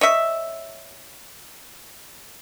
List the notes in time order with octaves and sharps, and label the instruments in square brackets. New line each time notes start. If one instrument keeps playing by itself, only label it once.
[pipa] C#5 D#5 E5